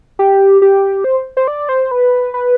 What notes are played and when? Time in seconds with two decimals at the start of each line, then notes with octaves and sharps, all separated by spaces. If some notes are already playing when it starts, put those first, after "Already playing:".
0.19 G4
0.62 G4
1.04 C5
1.37 C5
1.48 D5
1.69 C5
1.91 B4
2.34 B4